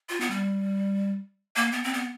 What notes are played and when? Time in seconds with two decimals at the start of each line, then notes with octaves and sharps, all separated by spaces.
0.09 F4
0.20 B3
0.30 G3
1.56 A#3
1.72 B3
1.84 C4
1.94 B3